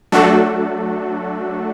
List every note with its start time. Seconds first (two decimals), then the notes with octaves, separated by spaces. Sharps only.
0.12 F#3 A3 D4 F#4 A4